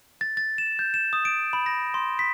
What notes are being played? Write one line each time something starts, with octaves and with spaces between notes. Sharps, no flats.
A6
A6
E7
G6
E7
D#6
D7
B5
A#6
C6
B6